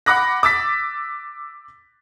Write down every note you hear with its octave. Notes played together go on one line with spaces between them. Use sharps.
F#5 B5 D6 F#6 A#6
D6 E6 A6 B6